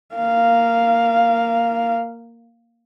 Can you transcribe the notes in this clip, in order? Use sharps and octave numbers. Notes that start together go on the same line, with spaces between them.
A#3 F5